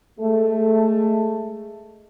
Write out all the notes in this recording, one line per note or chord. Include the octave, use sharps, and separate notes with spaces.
G#3 A3